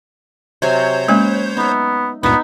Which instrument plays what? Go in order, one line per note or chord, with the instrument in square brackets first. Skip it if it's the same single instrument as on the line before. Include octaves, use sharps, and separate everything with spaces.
[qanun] C3 F#3 G#5 [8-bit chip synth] C5 C#5 G6
[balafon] G#3 A#3 C#4 [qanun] B4
[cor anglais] B3 [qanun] D#4 E5
[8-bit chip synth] C#2 G2 A#2 [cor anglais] B3 [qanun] D#4 E5